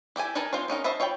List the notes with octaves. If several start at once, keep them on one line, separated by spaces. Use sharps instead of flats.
E4 G4 A4 G#5
D#4 A#4 B4 G#5 A5
C4 D4 D#4 F4 C5
B3 C#4 D#4 A#4
C5 D#5 E5 A5 B5
F4 C#5 F5 G5 B5